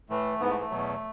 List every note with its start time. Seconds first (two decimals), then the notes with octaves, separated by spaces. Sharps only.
0.10 A2 E3 A3
0.40 G#2 E3 B3
0.50 A3
0.60 A3
0.71 E2 B2 F#3